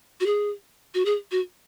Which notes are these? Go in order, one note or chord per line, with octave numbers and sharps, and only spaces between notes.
F#4
G#4
F#4
G#4
F#4